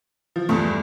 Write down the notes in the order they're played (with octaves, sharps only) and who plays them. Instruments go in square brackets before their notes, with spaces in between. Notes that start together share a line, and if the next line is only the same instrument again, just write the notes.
[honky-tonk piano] F3
[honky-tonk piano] E2 G2 [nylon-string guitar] G3 A3